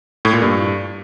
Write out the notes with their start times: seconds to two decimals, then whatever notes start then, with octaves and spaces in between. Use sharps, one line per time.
0.25 A2
0.33 A#2
0.42 G2